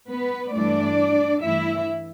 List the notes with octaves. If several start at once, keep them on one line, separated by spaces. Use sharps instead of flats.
B3 B4
G2 E3 A3 D4 D5
G2 E3 A3 E4 E5